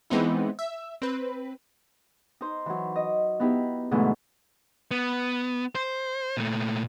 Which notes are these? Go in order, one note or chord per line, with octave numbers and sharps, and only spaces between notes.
E3 G#3 B3 C4 D#4 E4
E5
C4 B4
D#4 C5
E3 F#3
D#5
B3 D#4 E4 G4
G#2 B2 D3 E3 F#3 A3
B3
C5
A#2 A3